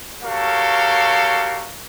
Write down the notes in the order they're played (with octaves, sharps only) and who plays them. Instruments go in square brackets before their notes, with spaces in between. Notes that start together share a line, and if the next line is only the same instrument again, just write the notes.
[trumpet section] F#4 G4 A4 A#4 C#5 F5